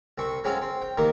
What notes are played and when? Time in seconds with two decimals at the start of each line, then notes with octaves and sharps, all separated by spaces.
0.18 C2 C4 C#6
0.44 F#3 G#3 C4 C#4 F4
0.62 C4
0.82 G5
0.98 C3 D#3 A#3 D#4